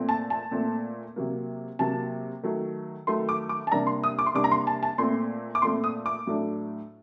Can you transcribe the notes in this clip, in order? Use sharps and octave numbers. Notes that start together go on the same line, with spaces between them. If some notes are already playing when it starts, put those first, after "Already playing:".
Already playing: A#2 A3 C4
A5
A5
A#2 A3 C4
C3 F#3 A#3
C3 F#3 A#3 A5
D#3 F#3 A3
D#3 F#3 A3 C6
D6
D6
A5
C3 G3 A#3 D4 A#5
C6
D#6
D6
C6
C3 G3 A#3 D4 D6
A#5
C6
A5
A5
A#2 A3 C4 C6
D6
A#2 A3 C4 C6
D#6
D6
A2 F#3 A3 D4